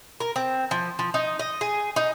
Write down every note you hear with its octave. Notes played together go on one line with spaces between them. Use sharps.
A#4
C4
F3
F3
D#4
D#5
G#4
D#4